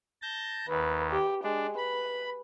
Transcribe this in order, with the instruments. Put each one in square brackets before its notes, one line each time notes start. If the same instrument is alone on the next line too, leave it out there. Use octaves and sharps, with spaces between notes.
[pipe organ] A5 G6 A#6
[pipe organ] D#2 [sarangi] B4
[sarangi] G4
[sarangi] G#3 [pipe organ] D4
[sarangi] B4 [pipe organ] B5